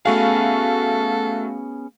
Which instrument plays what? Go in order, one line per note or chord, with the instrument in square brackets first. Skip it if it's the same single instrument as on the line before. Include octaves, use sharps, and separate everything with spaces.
[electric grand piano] A3 F#4 F5 [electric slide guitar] B3 C#4 G#4 [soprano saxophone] A4